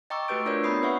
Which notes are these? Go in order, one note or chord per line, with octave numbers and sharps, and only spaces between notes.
D#5 G5 A#5 C#6 D6 E6
A3 F#4 G4 B4 G6 D7
D4 F4 A#4 C#5 D5 G6
B3 C4 A#5 B5 D#6 C7
B4 C#5 E5 F#5 C#6